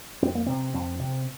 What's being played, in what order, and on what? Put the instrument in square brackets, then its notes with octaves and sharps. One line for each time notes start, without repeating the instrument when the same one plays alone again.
[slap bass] F2 C4
A#3
C3 C4
F2 C4
C3 C4